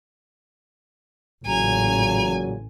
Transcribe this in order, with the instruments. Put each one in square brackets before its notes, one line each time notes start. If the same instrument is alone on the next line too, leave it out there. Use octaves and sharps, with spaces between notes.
[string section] A1 [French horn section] A#2 C#3 F#3 [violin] G#5 [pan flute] A#5